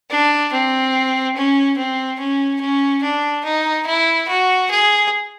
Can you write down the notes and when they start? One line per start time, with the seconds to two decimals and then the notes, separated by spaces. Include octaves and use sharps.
0.10 D4
0.53 C4
1.36 C#4
1.77 C4
2.19 C#4
2.61 C#4
3.03 D4
3.45 D#4
3.87 E4
4.28 F#4
4.70 G#4